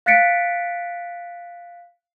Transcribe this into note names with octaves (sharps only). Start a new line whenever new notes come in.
F5 F#6 A6 B6 C#7 D7